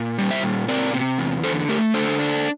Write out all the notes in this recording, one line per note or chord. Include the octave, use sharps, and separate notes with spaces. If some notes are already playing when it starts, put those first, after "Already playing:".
Already playing: A#2
G3
C5 E5
A#2
C4 A#4 D5
C3
E2
D3 A4 C5
A3 G4 A#4
D3 A4 C5
D4